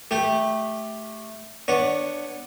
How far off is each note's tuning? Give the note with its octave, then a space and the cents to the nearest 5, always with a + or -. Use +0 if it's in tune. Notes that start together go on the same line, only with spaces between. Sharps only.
A3 -5 G4 +0
B3 +0 D4 +5 C#5 -10